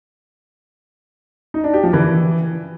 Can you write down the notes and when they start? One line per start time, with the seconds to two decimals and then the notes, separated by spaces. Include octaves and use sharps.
1.54 D#4
1.64 D4
1.74 G4
1.83 F3
1.93 E3